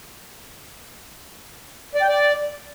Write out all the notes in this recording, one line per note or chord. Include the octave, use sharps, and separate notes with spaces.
D5
G5
D5